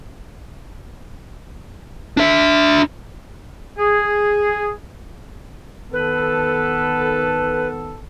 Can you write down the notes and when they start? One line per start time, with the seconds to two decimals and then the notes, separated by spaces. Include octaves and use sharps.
2.17 D4 E5
3.78 G#4
5.92 D#3 B3 A4 B4